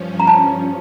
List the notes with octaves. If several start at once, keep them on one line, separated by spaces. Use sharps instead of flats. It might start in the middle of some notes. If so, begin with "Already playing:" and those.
Already playing: G2 F3 C#4
A#5
A5